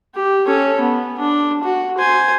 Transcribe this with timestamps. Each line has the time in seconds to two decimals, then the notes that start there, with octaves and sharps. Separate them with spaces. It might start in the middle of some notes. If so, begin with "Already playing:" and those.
0.15 G4
0.46 C#4 A4
0.80 B3
1.19 D4
1.63 F#4
1.98 C5 G#5